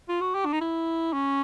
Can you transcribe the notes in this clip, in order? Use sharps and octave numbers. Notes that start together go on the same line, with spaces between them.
F4
F#4
G4
D4
D#4
E4
C#4